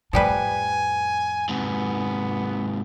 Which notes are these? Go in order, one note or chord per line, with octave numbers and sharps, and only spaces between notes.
F2 A2 F3 G3 B4 G#5
G#2 C3 B3